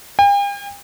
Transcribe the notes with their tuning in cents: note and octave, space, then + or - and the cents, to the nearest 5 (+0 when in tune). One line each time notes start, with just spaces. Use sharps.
G5 +45